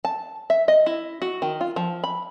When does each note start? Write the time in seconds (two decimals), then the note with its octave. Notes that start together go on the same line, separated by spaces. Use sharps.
0.05 A5
0.50 E5
0.68 D#5
0.86 E4
1.22 F#4
1.42 D#3
1.61 F4
1.76 F3
2.04 B5